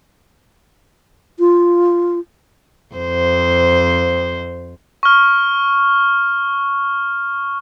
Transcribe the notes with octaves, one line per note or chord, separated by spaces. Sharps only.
F4
F2 C5
C#6 F6